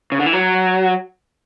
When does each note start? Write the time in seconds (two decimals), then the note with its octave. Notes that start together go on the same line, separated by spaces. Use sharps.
0.12 C#3
0.19 D3
0.26 E3
0.33 F#3